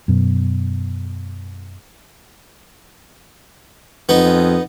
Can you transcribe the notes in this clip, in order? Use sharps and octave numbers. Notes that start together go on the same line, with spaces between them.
F#2 B2
F2 B3 D#4